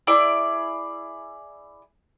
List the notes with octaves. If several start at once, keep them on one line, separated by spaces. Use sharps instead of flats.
E4 G#4 D5